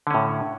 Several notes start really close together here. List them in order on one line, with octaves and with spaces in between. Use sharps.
D3 C#4 A2